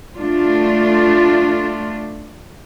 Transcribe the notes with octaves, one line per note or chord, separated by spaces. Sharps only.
A3 D4 F4